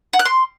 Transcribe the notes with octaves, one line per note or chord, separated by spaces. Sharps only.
F#5
F#6
C6